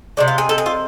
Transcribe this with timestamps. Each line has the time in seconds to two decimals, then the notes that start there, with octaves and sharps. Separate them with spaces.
0.17 C3 F3 G#3 D5
0.28 F4
0.38 G#4
0.49 A4
0.58 G#4
0.66 F4